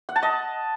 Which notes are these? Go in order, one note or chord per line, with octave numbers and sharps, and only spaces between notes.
F#5
A5
D#5